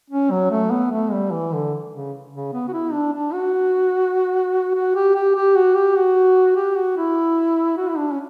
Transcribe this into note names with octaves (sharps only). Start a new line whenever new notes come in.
C#4
F#3
A3
B3
A3
G3
E3
D3
C#3
C#3
B3
F#4
E4
D4
D4
F#4
F#4
G4
G4
G4
F#4
G4
F#4
G4
F#4
E4
F#4
E4
D4
C#4